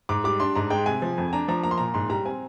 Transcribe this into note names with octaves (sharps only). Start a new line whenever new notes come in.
G#2 D6
G3 D6
D4 C6
G#2 A#5
G#3 G5
C3 G#5
F3
F2
D4 A#5
F3 A#5
A#3 A#5
C6
A#2 A#5
G#2 C6
G3 A#5
C4 G#5